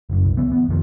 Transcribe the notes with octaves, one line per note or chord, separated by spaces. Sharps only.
F#1 F#2
C2
E3 B3
B3
F2 D#3 F3